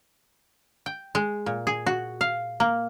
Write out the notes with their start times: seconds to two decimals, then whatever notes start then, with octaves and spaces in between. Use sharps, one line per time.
0.86 G5
1.15 G#3
1.46 A#2
1.67 G#4
1.86 F#4
2.21 F5
2.60 A#3